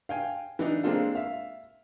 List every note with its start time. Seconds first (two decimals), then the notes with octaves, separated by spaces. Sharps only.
0.09 F5 G5 G#5
0.59 E3 D4 D#4
0.83 G#3 A#3 C4 D4 F4 A4
1.15 E5 F5